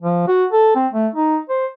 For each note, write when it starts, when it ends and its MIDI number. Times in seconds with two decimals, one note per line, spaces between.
0.02 0.27 53
0.28 0.45 66
0.52 0.71 69
0.76 0.88 60
0.93 1.08 57
1.15 1.39 63
1.50 1.66 72